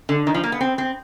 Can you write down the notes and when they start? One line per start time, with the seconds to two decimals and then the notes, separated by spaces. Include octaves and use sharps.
0.09 D3
0.27 D#3
0.34 F3
0.44 A#3
0.52 B3
0.61 C4
0.78 C4